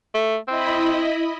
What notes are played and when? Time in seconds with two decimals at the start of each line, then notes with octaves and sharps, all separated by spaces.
0.14 A3
0.48 C4 E4 D#5 B5